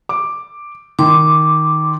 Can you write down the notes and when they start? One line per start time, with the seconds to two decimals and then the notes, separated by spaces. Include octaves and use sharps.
0.09 D6
0.99 D#3 C6 D6